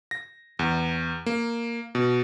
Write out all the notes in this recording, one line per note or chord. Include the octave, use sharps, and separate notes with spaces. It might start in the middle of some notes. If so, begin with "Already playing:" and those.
A#6
E2
A#3
B2